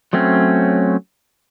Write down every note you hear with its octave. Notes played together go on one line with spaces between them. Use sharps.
F#3 A3 C4 C#4